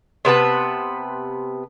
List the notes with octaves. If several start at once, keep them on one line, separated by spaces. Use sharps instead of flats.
C3 B3 B4 A5